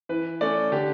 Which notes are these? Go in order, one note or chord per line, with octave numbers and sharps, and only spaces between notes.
E3 B4
A3 C#4 D5
D3 G4